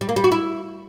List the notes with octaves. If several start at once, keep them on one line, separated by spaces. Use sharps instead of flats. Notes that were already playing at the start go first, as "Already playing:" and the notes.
G3
A#3
G3
F#4
E4